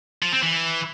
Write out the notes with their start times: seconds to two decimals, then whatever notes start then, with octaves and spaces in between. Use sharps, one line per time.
0.23 F3
0.33 C4
0.43 E3